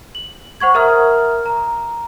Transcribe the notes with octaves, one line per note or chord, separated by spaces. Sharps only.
F#7
C5 F#5 C#6 G#6
A#4 E5 A#5 D#6 F6
A#5